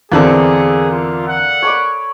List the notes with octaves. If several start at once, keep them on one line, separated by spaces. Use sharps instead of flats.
E2 D3 A#3 C4 D4 G#4 A4
F4
F#5
C#5 B5 D6